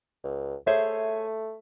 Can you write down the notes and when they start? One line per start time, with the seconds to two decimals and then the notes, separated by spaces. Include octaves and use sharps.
0.24 C#2
0.67 A3 G#4 C5 C#5 E5